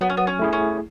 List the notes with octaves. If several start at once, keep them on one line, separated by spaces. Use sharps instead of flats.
F#3 B3
C#4
B3
C#4
A3 E4 G#4
C#4